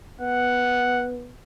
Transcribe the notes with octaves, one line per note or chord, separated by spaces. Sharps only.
B3 F#5